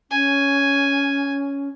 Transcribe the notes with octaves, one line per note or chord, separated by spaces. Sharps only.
C#4 G#5